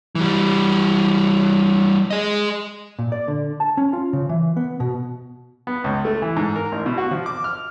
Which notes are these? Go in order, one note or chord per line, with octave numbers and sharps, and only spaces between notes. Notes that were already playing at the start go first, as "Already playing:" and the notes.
E3 G3
G#4 D#5
A#2
D5
D3
A5
C#4
F4
C#3
E3
B3
B2
B3
C#2
A3
E3
G#2
A#4
A1
B2
F#4
F3
D6
F6